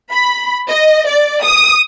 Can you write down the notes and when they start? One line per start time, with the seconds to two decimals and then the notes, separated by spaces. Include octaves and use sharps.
0.12 B5
0.68 D#5
1.07 D5
1.43 D#6